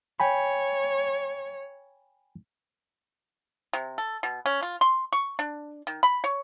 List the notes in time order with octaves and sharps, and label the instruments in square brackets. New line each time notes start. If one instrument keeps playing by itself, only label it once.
[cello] C#5 [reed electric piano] G5 G#5 B5
[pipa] C3
A4
B2
C#4
F4
C6
C#6
D4
D#3
B5
C#5